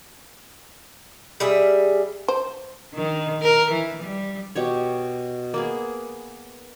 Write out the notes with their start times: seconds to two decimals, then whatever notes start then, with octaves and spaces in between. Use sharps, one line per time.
1.40 G3 G#4 E5
2.28 C5
2.94 D#3
3.43 A#4
3.72 E3
4.03 G3
4.55 B2 G4 C#5
5.54 A#3 B3 G#4